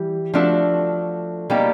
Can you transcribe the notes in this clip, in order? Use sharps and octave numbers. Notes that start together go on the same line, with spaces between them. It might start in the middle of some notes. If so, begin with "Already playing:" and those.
Already playing: E3 G3 G4
F3 A3 D4 F#4 A4
B2 G3 A#3 D#4 G4